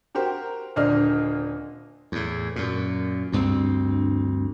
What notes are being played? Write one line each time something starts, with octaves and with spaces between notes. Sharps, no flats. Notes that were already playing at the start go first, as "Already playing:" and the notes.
F#4 G4 A#4 C5
D#1 D3 D4 C5 D#5 F6
E2 A2
F#2 A#2
D2 G2 B3 C4